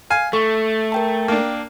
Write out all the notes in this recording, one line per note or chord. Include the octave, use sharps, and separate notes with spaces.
F5 G#5
A3 A4 C#6
A#4 G5 A5
A#3 D4